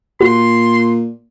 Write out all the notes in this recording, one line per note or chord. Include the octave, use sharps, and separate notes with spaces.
A#2 F#4 C6